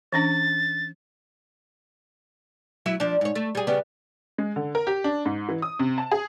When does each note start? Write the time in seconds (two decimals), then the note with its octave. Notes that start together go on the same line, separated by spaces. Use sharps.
0.12 E3 C#4 D4 A6
2.86 F#3 E4 E5
3.00 F3 D4
3.21 G#2 C#5
3.35 A3
3.55 G3 G#4
3.67 C#3 G3 B3
4.38 G#3
4.56 D3
4.75 A#4
4.87 G4
5.04 D4
5.26 G#2
5.49 E3
5.62 D#6
5.79 C3
5.98 A5
6.12 G#4